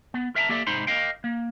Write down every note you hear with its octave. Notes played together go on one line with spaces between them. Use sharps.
B3
A#4 E5 F5 G5 A5 A#5
A#3 G4 A4 D5 E5
G#2 C3 D#4 C5 B5 C6
A#4 D#5 F5 G5
A#3